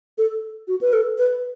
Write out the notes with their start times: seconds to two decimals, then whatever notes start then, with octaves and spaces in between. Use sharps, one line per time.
0.18 A4
0.68 F#4
0.81 B4
0.93 A4
1.18 B4